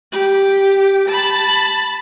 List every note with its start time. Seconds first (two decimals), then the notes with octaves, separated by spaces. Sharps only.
0.12 G4
1.08 A5 B5